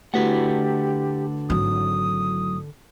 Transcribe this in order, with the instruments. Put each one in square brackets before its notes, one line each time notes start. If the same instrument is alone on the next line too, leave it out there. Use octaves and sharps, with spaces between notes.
[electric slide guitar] D3 B4 F#5 [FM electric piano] A3 E4 F#4 [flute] G4
[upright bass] G#1 F#3 [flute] D#6